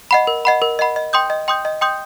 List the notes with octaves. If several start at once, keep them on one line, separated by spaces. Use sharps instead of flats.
D#5 F#5 B5
A#4
D#5 F#5 B5
A#4
D#5 F#5 B5
D#5
G5 C6 D#6 G6
D#5
G5 C6 D#6 G6
D#5
G5 C6 D#6 G6